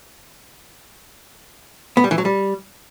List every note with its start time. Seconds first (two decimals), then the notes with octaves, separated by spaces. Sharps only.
1.97 B3
2.04 G3
2.11 E3
2.18 F#3
2.25 G3